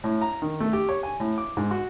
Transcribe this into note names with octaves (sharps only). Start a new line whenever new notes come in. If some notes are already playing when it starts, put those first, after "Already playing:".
A2
A#5
D#3
A3
G4
C#5
G#5
A2
D6
G#2
F#4